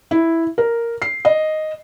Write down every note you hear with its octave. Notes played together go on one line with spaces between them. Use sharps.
E4
A#4
C7
D#5